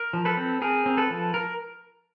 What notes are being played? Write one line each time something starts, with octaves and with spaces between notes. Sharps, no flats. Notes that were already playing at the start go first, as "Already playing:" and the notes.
Already playing: A#4
F3
A4 B4
C4
C4 G#4 A#4
C4
A4 B4
F3
A#4